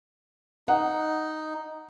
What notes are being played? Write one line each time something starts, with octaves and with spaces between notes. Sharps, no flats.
D#4 F#5